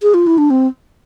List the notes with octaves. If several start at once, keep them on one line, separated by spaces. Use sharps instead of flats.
G#4
F4
E4
D4
C4